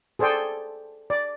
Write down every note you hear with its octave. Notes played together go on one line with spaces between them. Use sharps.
G#4 A4 C5 D5 G5
D5